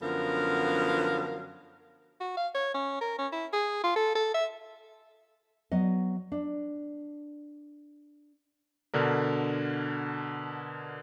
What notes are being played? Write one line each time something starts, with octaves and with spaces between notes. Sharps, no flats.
F#2 D3 F3 B3 A#4 F5
F#4
F5
C#5
C#4
A#4
C#4
E4
G#4
F4
A4
A4
E5
F#3 B3 D#5
D4
B2 D3 D4 A#4